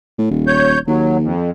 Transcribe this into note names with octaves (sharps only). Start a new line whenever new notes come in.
A2
D#1
C#5 G6
D#2 F#3
F2